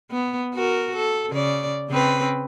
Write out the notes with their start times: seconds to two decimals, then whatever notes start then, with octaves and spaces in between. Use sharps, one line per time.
0.11 B3
0.54 F#4 A#4
0.96 A4
1.30 C#3 D5
1.89 C#3 C4 B4